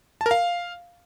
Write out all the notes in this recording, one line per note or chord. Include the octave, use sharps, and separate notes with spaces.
A5
A#4
F5